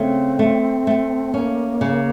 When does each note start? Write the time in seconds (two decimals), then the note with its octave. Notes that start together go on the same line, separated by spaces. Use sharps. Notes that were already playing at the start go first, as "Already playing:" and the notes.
Already playing: C#3 A3 C4
0.39 A3
0.87 A3
1.34 A#3 C#4
1.81 C#3